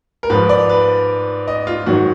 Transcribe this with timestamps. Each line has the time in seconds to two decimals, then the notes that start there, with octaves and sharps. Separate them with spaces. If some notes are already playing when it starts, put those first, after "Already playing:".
0.23 A#4
0.30 G#2 F3 B4
0.49 D5
0.69 B4
1.48 D#5
1.67 F4
1.86 G#2 D#3 F#3 F#4